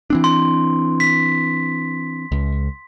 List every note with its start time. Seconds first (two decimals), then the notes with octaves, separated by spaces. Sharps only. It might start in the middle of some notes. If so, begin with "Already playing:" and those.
0.10 E3 C4 D4
0.24 C6
1.00 B6
2.32 C#2